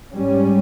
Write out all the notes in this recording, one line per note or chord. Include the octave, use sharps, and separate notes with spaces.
G#2 G3 C#4